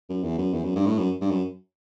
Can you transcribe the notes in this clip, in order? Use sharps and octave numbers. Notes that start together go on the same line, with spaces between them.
F#2
E2
F#2
E2
F#2
G2
A2
F#2
G2
F#2